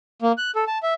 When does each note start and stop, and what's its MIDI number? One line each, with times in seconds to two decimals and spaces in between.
0.22 0.32 58
0.38 0.51 90
0.56 0.64 69
0.67 0.78 81
0.83 0.94 76